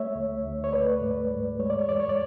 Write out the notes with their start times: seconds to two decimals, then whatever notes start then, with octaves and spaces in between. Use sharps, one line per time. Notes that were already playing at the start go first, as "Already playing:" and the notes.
Already playing: A3 C#5 E5
0.15 D2
0.44 D2
0.64 C#5
0.72 A3 B4 D5
1.01 G#2
1.30 G#2
1.59 G#3 C#5
1.70 D5
1.79 C#5
1.87 E2 D5
2.00 C#5
2.09 D5